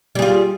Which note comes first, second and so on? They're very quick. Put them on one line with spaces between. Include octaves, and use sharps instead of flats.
G3 G#4 F4